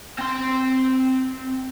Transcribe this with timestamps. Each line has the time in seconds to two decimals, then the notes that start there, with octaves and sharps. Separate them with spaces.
0.18 C4 C6